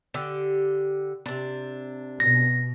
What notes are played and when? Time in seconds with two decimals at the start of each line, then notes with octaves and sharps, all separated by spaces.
0.14 D3 G4
1.26 C3 D4
2.20 B2 A#6